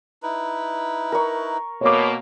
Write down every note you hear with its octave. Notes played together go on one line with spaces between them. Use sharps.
D#4 E4 B4
A#4 C#6
B2 A#3 C#5 D6